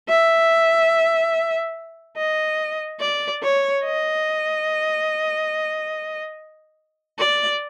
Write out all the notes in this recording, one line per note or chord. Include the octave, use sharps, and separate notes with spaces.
E5
D#5
D5
C#5
D#5
D5